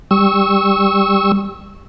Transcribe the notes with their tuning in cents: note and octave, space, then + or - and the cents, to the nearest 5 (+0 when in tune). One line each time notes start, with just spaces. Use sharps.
G3 +10 C#6 -10 E6 -20